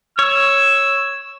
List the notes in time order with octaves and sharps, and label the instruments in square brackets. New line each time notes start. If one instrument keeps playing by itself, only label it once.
[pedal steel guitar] C#5 [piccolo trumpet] E6